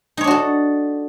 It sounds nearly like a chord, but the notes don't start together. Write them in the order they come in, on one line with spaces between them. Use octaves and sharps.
D#4 C#5 D4 F#4 A4